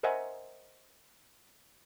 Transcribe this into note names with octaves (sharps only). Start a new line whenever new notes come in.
A#4 C5 D#5 E5 F#5 G#5